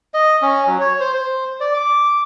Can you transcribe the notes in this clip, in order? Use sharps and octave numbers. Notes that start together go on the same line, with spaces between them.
D#5
C#4
F#3
C#5
C5
C5
D5
D6